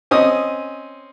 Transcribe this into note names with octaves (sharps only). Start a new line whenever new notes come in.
C4 C#4 D#5 D#6